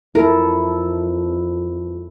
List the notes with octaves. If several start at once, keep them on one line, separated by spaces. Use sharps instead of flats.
F2 E4 A4 A#4